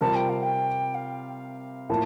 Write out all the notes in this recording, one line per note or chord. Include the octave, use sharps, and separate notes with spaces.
C3 G3 C4 F4 A#4 A5
G5
F5
G5
F5
A2 F3 A#3 E4 A5